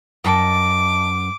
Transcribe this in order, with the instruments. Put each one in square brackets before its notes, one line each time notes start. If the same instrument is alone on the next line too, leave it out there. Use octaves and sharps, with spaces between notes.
[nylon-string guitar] F#2 [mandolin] D#5 G5 A5 [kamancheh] D6